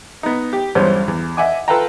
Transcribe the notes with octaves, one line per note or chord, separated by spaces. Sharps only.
B3 D#4
G4
B1 E2 G2 C#4 C5
E2
D#5 E5 F#5 G#5 D6
F4 A4 B4 F5 G5 A#5